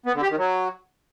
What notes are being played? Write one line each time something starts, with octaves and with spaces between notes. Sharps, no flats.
B3
D3
G4
D#3
F#3